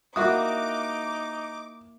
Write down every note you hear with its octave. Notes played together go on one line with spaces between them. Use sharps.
A#3 D#4 E4 F#4 D6 D#6